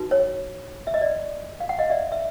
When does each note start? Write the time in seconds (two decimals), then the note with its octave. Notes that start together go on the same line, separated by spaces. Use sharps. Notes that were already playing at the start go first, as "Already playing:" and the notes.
Already playing: D#4 F#4 B4
0.11 C#5
0.87 E5
0.94 D#5
1.01 D5
1.60 F5
1.69 F#5
1.79 D#5 F5
1.90 D5 E5
2.12 E5